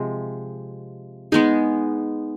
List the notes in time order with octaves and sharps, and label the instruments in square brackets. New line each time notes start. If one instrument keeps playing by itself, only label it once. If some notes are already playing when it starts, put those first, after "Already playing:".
Already playing: [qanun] C3 F3 G#3
G#3 B3 D#4 G#4